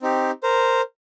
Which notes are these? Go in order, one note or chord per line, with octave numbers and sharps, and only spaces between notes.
C4 D#4 G4
A#4 C5